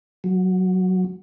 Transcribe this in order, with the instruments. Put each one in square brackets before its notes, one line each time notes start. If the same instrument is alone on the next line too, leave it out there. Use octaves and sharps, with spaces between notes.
[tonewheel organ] F#3